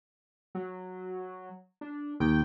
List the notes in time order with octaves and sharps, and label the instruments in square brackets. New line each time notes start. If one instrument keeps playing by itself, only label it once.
[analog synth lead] F#3
D4
[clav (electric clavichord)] D#2 [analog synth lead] G5